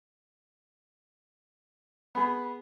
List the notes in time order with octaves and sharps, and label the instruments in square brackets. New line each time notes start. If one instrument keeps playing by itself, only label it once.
[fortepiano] B3 G#4 [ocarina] B5